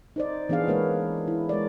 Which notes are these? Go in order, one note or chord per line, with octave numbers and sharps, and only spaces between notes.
D#4 C5 D5
E3 B3 D4 G#4 F5
G#3 A#3 B4 C#5 F5
E4
G#3 A#4 C#5 D5